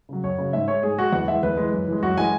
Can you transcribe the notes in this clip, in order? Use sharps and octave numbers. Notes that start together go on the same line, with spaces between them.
C#3 F#3
F#2 C#5
C#3 F#3
G#2 E5
G#3 C#5
G#2 G#4
G#3 F#4
E2 F#5
E3 G#3 E5
E2 B4
E3 G#3
F#2
E3 G#3
F#2 F#4
E3 G#3 G#5